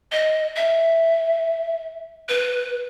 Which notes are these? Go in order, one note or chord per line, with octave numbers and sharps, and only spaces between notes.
D#5
E5
B4